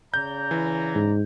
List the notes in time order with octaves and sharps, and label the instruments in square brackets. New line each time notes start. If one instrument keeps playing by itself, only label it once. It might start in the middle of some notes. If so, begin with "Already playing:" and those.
[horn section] C#3 D5 A#5 [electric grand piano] G6
[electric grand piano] E3
[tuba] G#2